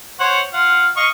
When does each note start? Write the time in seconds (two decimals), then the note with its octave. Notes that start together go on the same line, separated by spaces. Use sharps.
0.20 C5 C#5 F#5
0.53 F4 F5 F#5
0.96 D#5 F5 C#6